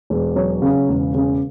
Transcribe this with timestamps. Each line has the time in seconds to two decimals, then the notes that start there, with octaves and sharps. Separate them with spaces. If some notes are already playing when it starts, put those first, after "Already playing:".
0.10 E1
0.36 F#3
0.62 C#3
0.89 E1
1.14 C#3